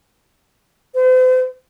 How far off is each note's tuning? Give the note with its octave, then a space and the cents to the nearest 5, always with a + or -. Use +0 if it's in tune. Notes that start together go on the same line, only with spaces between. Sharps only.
C5 -40